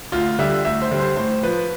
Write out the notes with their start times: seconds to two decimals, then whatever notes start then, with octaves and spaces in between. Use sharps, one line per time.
0.12 D2 F4
0.39 D3 G3 E5
0.65 D2 E5
0.82 C5
0.91 D3 G3
1.00 C5
1.17 A2 C5
1.43 F3 B4